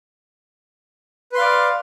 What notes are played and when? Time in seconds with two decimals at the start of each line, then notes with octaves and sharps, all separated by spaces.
1.32 B4
1.35 C6
1.38 F5
1.41 D5